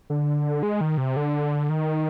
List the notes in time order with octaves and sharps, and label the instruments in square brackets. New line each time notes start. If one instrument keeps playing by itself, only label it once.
[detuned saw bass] D3
G#3
D#3
C3
D3
D#3